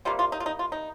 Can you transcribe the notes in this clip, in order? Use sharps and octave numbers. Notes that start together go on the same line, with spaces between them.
C3 G3 A#3 F4
F4
D#4
F4
D#4
F4
D#4